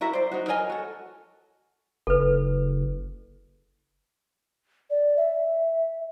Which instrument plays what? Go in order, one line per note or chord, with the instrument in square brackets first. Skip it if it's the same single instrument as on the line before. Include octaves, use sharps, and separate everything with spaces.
[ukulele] E4 F#4 A#4 E5
C5 D5
D#4 F#4
A#4 C#5 D#5 G#5
F#4 A4
[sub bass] F#1 [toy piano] A4 B4
[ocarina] D5
E5